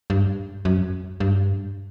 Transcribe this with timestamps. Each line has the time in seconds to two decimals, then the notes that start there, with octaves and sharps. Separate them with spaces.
0.10 G2
0.65 F#2
1.20 G2